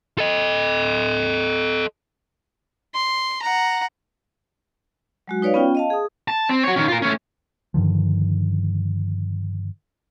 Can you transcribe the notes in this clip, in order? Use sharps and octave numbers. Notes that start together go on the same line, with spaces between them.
A4 D#5
C6
F#5 A#5
F#3 G#3 F#4
D#4 B4 C#5 D5 F5
B3 C#4 F4 G5
D#5 F5 A5
G#4 D#6
A5
C4
F#4 C#5
D#3 C#4
F4 A#4
A3 C#4
G2 D3 D#3 F3